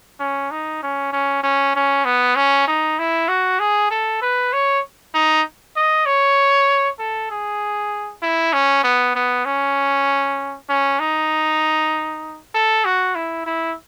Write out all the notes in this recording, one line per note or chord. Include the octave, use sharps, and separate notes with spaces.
C#4
D#4
C#4
C#4
C#4
C#4
B3
C#4
D#4
E4
F#4
G#4
A4
B4
C#5
D#4
D#5
C#5
A4
G#4
E4
C#4
B3
B3
C#4
C#4
D#4
A4
F#4
E4
E4